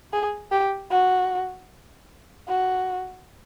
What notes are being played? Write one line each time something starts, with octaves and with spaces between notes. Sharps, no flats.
G#4
G4
F#4
F#4